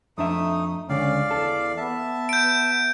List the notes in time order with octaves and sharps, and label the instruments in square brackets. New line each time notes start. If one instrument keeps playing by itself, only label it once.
[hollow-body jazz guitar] F2 D4 E5 [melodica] A3 D#4 D#6
[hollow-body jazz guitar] C#2 D3 [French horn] C#4 [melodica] D5 F5
[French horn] E2 [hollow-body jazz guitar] A4
[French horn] B3 [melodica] E5 A5
[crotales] G6 D7